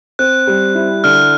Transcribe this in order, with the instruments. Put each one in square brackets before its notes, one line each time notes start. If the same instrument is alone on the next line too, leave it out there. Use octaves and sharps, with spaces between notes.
[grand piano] C4 [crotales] F#6
[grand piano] G3
E4
[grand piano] D3 [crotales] F6